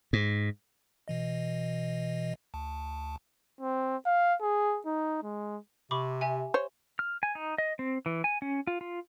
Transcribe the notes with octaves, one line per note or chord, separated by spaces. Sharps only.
G#2
B2 E3 D#5
D2 A5
C4
F5
G#4
D#4
G#3
C3 B5 C#6 D6
G4 E5 G#5
C5 C#5
F6
G#5
D#4
D#5
C4
E3
G#5
C#4
F4
F4